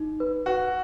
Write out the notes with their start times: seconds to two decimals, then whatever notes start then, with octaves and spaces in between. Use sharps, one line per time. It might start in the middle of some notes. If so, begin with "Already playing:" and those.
Already playing: D#4
0.20 B4
0.46 F#4 B4